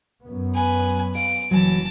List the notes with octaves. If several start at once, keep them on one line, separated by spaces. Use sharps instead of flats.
F#2 B3
B4 G#5
F5 D7
F#1 E3 F#3 A5